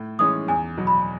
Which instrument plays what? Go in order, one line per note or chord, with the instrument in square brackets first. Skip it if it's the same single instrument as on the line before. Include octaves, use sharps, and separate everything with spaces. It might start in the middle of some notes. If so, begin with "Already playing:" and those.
Already playing: [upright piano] A2
[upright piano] E3 G#3 C#4 [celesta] D#6
[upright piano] E2 [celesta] G#5
[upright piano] B2 F#3
[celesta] B5